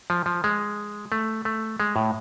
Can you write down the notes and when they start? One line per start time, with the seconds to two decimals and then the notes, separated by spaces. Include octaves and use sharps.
0.10 F3
0.26 F3
0.44 G#3
1.12 A3
1.45 A3
1.80 G#3
1.96 A2